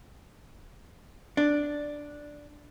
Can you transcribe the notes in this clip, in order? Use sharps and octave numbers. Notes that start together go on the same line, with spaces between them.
D4